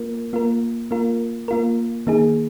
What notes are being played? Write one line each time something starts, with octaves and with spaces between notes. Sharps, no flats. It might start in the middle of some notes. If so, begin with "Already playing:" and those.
Already playing: A#3 F4 A#4
A#3 F4 A#4
A#3 F4 A#4
A#3 F4 A#4
D#3 A#3 D#4 G#4